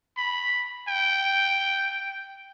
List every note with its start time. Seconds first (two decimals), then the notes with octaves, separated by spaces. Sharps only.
0.17 B5
0.88 G5